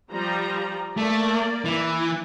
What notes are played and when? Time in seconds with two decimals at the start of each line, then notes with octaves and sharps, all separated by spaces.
0.12 F3 G3 A#5
0.97 A3 A#3 D5
1.65 E3